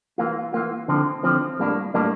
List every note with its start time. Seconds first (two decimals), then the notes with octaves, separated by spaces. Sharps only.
0.18 E3 A#3 F4
0.52 E3 A#3 F4
0.88 D3 F3 C4
1.23 D3 F3 C4
1.59 A2 G3 A#3 D4
1.94 A2 G3 A#3 D4